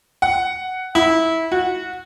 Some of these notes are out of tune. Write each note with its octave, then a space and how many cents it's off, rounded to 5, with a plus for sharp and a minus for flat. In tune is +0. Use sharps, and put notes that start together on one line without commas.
F#5 +5
E4 -20
F#4 -15